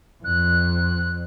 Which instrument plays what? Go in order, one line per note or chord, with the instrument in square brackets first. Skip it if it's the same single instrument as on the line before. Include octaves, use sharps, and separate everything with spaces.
[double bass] F2 [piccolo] F#6